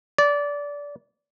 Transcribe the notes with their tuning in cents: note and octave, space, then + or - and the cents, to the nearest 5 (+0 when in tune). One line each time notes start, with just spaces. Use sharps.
D5 -20